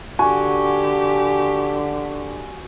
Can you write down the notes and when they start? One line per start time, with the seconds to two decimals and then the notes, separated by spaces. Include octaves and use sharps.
0.19 D3 F#4 G4 G#5